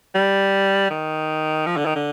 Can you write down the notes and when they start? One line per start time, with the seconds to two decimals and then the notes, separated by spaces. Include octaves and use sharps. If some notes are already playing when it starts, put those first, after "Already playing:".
0.15 G3
0.90 D#3
1.66 F3
1.77 D3
1.86 D#3
1.96 D3